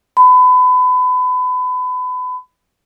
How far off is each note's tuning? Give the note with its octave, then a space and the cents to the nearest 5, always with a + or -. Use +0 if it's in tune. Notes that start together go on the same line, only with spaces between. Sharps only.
B5 +30